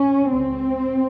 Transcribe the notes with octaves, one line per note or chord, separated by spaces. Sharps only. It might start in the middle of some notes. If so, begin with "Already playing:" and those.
Already playing: C#4
C#2 C#3 C4